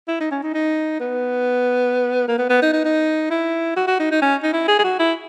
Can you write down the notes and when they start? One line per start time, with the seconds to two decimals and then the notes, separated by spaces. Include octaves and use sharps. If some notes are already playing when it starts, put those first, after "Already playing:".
0.08 E4
0.20 D#4
0.31 C#4
0.43 D#4
0.54 D#4
1.00 B3
2.28 A#3
2.39 B3
2.49 B3
2.62 D#4
2.73 D#4
2.85 D#4
3.31 E4
3.76 F#4
3.88 F#4
4.00 D#4
4.12 D#4
4.22 C#4
4.43 D#4
4.53 E4
4.68 G#4
4.79 G#4
4.84 F#4
4.99 E4